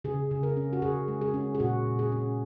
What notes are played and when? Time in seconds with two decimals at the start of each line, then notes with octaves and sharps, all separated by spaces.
0.04 C#3 G#4
0.31 C#3
0.43 A#4
0.57 C#4
0.73 F#4
0.82 C#3 G#4
1.08 G#3
1.21 G#4
1.34 C#4
1.55 G#4
1.60 A#2 F#4
1.86 A#2
1.99 G#4
2.12 C#4